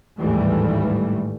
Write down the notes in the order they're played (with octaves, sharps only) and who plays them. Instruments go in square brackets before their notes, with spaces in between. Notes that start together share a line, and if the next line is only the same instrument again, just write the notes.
[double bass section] A1 D#2 G#2 E3 G3 A3